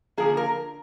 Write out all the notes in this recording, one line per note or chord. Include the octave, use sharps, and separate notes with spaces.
D3 F3 A#3 G#4
A#4